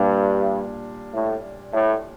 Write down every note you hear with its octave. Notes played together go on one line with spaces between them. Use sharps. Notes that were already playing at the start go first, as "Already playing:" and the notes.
Already playing: G2 A#2 G3 D4
A2
A2